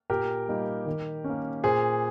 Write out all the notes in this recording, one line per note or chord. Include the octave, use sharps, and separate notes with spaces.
A#2 G4 A#4
G3 A#3 D#4
D#3
C#4
A#3
A#2 G#4 C5